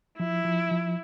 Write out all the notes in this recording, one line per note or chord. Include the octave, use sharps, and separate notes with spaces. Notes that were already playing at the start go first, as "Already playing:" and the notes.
F3 E4
F3
F3